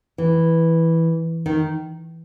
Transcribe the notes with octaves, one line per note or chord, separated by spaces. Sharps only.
E3
D#3